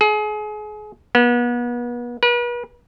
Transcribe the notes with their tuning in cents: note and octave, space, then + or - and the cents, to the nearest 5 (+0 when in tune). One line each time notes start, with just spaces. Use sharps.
G#4 +30
B3 -35
B4 -40